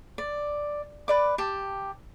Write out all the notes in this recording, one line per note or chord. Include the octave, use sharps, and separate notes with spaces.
D5
B4 D5 D6
G4 A5